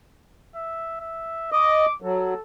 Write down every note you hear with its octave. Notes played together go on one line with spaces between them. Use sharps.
E5
E5
D#5 D6
F#3 A4